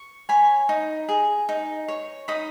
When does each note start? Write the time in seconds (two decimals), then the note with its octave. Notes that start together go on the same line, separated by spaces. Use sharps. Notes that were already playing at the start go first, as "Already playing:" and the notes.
Already playing: C#6
0.29 C#5 G#5 B5
0.69 D#4
1.09 G#4
1.49 D#4
1.88 C#5
2.28 D#4 B5 D#6